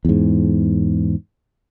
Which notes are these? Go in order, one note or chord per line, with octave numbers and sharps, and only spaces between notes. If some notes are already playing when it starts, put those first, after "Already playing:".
E2 G#2